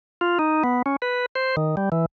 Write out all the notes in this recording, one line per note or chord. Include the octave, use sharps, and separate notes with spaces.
F4
D#4
B3
C#4
B4
C5
D#3
G3
E3